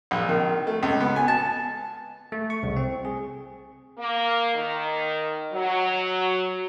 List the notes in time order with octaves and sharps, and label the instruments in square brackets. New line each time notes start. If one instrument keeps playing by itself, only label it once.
[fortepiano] A#1
D#3
A3
C#2
B3
G#5
A5
[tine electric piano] A3
C#6
C2
C4
G#4
[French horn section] A#3
D#3
F#3